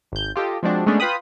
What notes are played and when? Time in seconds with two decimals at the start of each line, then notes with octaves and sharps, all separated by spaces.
0.12 G#1 G6
0.36 F4 G4 A4 D#5
0.63 F3 G#3 C4 D4 F#4
0.86 G#3 A3 B3 C#4 D4
1.00 F4 B4 G5 B5 D#6